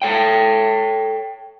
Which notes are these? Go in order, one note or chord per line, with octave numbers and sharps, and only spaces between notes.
A4 C#5 G5